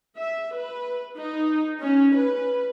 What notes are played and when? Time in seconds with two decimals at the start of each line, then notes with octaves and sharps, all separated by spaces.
0.17 E5
0.54 B4
1.16 D#4
1.81 C#4
2.15 B4